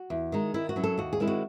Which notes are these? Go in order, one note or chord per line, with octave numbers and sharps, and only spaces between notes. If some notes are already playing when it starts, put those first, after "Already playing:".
Already playing: F#4
E2
D#3 G#3 D#4
D#3 E4
F#4
F#3 C#4 E4
A4
D#2 F#4
G#4
D#3 G#3 C4 E4
F#4